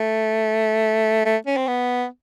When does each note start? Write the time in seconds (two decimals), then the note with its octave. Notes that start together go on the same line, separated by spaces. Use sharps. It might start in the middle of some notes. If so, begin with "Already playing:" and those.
Already playing: A3
1.26 A3
1.46 C#4
1.57 C4
1.68 B3